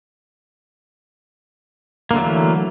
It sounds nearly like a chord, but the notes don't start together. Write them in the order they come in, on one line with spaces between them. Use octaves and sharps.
A#3 D3 A3 F#3 E3